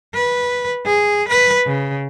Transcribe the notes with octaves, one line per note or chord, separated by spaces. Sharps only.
B4
G#4
B4
C#3